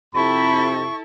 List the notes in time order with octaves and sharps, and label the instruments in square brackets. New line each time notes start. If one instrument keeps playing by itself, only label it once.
[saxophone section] F2 C3 [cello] E4 A4 [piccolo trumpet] B5 [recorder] C#6